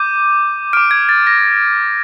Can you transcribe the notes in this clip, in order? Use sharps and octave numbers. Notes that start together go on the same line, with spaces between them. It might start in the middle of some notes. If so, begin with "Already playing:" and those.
Already playing: D6 G6 D#7
D6 F6 D7
G#6
A6
A#6